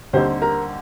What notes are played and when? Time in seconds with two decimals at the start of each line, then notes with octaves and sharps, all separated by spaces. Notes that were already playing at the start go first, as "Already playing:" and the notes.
0.13 D#2 D3 G3 C4 D#4 C5
0.42 A#4